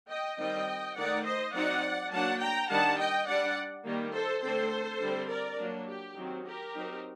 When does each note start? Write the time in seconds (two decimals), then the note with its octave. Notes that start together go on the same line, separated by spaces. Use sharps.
0.09 D#5 G5
0.39 D#3 G3 C4 D#5 G5
0.96 D#3 A3 D#4 D5 F#5
1.25 C5 D#5
1.53 F#3 C4 D#4 D5 F#5
2.11 F#3 A#3 D4 F#5 A5
2.40 G5 A#5
2.69 D#3 G3 D4 F#5 A5
2.98 D#5 G5
3.27 G3 D4 D5 F#5
3.85 D#3 G3 A#3
4.13 A4 C5
4.42 D3 A3 C4 A4 C5
5.00 D3 G3 C4
5.29 A#4 D5
5.57 F#3 A#3 D4
5.87 G4
6.16 D#3 F#3 C4
6.45 G4 A#4
6.74 F#3 C4 D#4